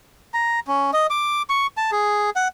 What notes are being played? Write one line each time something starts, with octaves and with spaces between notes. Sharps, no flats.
A#5
C#4
D#5
D6
C#6
A5
G#4
F#5